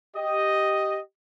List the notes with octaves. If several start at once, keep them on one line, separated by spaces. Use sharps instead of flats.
G4 D#5